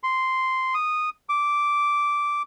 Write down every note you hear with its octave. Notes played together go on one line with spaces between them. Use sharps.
C6
D#6
D6